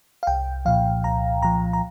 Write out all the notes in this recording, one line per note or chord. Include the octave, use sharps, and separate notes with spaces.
F5
C2 G5
A#2 F3 F5
C2 A#5
A#2 F3 A#5
A#5